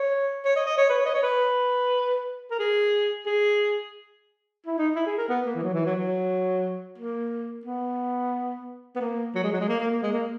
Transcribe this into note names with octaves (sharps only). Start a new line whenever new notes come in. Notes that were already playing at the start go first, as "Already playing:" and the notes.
Already playing: C#5
C#5
D#5
D#5
C#5
B4
C#5
D#5
C#5
B4
A#4
G#4
G#4
E4
D#4
E4
G#4
A#4
B3
A#3
E3
F#3
E3
F#3
F#3
A#3
B3
B3
A#3
F#3
G#3
F#3
G#3
A#3
A#3
A#3
G#3
A#3